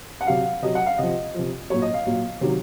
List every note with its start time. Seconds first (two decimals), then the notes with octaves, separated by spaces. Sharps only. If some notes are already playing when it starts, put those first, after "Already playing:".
0.21 F#5
0.27 C3 F#3 F5
0.62 C3 F#3 D#5
0.75 F#5
0.86 F5
0.98 C3 F3 D#5
1.34 C3 F3
1.70 A#2 F#3 C#5
1.82 D#5
1.94 F5
2.06 A#2 F#3
2.41 C3 D#3 F#3